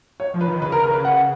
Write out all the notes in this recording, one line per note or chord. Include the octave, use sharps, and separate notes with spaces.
C#5
F3
B4
D#3
C#3 B4
A#4
A#4
B4
F#5